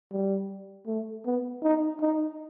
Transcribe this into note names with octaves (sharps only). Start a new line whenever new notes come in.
G3
A3
B3
D#4
D#4